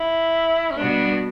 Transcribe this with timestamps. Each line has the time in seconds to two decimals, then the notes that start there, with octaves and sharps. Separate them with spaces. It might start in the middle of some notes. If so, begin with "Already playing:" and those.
Already playing: E4
0.71 C#4
0.78 B2 G3 B3 D4 F#4